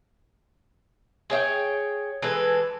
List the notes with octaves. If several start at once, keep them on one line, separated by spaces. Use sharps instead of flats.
G#4 C#5 E5 G5
E3 G#3 A4 B4